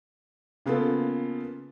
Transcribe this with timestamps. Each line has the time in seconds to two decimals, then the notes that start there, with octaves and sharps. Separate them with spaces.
0.66 C#3 A#3 B3 F4 A4